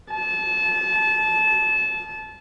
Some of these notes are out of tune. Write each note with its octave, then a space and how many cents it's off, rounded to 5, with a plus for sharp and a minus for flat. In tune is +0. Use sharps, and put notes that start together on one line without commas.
A5 -25